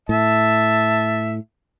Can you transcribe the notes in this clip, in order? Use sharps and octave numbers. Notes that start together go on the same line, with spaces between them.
A2 E5 A5